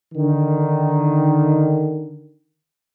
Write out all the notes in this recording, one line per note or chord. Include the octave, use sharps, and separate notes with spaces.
D3 D#3